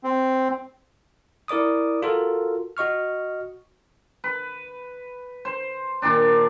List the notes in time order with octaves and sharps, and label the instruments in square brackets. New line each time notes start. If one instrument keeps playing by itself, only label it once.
[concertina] C4
[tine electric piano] E4 A#4 D5 D6 D#6
F4 F#4 A4 A#4
F#4 D#5 C#6 F6
[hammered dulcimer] B4
C5
A#2 D#3 D4